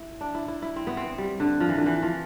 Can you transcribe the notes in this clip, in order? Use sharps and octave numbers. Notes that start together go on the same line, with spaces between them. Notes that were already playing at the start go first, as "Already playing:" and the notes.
Already playing: E4
D4
E4
E4
E4
C4
B3
C4
G3
D3
F3
E3
D3
E3
F3